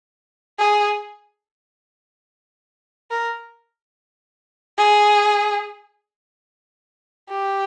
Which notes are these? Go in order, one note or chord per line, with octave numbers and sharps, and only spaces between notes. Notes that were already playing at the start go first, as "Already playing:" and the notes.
G#4
A#4
G#4
G4